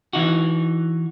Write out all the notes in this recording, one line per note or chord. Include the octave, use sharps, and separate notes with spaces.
E3 D#4 F#4